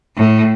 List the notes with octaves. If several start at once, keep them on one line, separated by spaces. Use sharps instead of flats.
A2